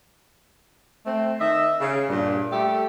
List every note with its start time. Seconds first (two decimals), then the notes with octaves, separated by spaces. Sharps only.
1.06 A3 C4
1.41 D#3 D#5 E5
1.81 C#3
2.09 G2 A#2
2.52 G3 A3 G4 A4